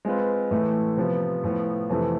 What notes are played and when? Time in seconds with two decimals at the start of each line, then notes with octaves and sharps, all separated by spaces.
0.05 G#3 C4 F4 B4
0.51 A2 E3 A3
0.97 C3 F3 B3
1.44 A2 F3 B3
1.89 F2 C3 E3 A3